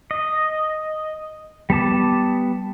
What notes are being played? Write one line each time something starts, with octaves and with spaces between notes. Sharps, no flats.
D#5
G3 B3 A5 D6